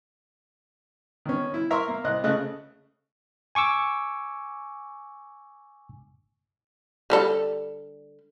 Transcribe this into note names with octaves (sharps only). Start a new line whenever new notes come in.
D#3 C#4
E4
A#4 E5 A#5 C6 C#6
A#3
C2 D#5 F#6
C#3 A3 D#5 F#6
G#5 C#6 D6 E6
D3 G3 A4